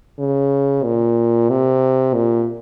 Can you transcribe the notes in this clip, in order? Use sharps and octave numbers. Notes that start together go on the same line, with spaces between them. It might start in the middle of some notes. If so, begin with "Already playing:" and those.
C#3
A#2
C3
A#2